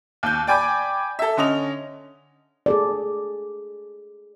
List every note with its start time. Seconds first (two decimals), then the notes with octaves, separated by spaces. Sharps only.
0.23 D#2 G6
0.47 D5 G5 G#5 B5 D6
1.19 A4 E5
1.37 D3 C#4 D#5 F7
2.66 G#4 A4 D5